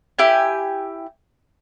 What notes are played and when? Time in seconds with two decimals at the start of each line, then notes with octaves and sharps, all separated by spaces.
0.19 E4 G4 G#5